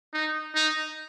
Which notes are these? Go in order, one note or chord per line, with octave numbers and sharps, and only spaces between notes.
D#4
D#4